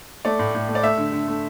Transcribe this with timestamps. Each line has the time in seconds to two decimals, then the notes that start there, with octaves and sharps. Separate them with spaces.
0.25 A3 D5
0.39 A2
0.55 A2
0.69 A3
0.75 D5
0.83 A3 E5
0.97 D3
1.12 D3
1.28 A3